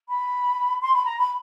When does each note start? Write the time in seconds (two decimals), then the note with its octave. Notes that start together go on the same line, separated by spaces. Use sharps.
0.09 B5
0.82 C6
0.94 B5
1.05 A#5
1.18 B5